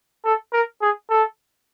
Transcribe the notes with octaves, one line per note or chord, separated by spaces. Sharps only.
A4
A#4
G#4
A4